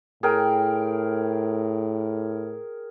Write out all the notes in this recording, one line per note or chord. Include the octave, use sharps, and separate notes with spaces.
A2 G#4 A#4 G5